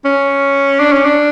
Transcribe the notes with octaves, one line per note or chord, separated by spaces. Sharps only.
C#4
D4
C#4
D4